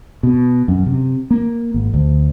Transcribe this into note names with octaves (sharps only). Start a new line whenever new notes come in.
B2
F#2
C3
A#3
G#1
D2